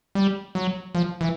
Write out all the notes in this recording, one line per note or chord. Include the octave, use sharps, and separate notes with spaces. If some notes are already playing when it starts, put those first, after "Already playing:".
G3
F#3
F3
E3